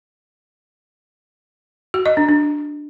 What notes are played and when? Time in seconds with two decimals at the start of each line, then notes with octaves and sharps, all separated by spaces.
1.94 F#4
2.06 D#5
2.17 D4
2.29 D4